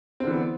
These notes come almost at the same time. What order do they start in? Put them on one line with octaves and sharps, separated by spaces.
C4 D3 E3 B3